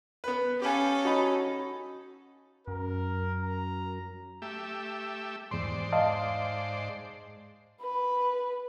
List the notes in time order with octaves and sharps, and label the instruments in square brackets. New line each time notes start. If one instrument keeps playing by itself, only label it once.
[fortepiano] B3 B4
[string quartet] C#4 A4 [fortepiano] G4 F5 G#5
[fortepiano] D#4 [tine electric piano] F#4 B5
[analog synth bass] F#2 [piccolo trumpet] A#4
[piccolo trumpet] A#5
[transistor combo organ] A3 G4 E5
[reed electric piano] E2 C6 [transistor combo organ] G#2 C5 D5
[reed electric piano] D#5 F5 A5
[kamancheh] B4